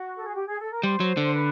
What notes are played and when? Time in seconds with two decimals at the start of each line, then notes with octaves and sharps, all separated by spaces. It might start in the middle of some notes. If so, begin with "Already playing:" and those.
Already playing: F#4
0.17 A4
0.25 G#4
0.34 G4
0.45 G#4
0.59 A4
0.72 A#4
0.83 G3 C5
1.00 F#3
1.17 D3
1.33 B4